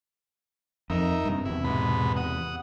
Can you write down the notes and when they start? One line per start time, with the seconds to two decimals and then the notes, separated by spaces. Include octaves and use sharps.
0.90 F2 D#4 A#4 E5
1.25 G2 C3
1.45 E2 C3 E4
1.64 G#2 B2 B5
2.16 F#5 D#6